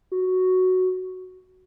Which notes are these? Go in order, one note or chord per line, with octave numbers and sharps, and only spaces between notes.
F#4